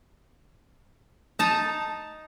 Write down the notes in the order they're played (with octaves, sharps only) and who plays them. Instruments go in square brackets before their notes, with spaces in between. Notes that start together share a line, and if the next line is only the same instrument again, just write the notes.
[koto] D#4 A5 A#5